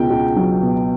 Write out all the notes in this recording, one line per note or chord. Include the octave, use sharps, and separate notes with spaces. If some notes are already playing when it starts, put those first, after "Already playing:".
Already playing: C#2 B2 G5
C#2
F#3
B2